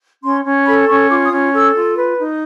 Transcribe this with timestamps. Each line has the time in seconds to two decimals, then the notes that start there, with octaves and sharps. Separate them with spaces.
0.24 C#4 C6
0.45 C#4
0.67 A4 B5
0.88 C#4 C#6
1.10 F4 D6
1.25 D#6
1.32 C#4
1.54 A4 E6
1.75 F4
1.97 B4
2.19 D#4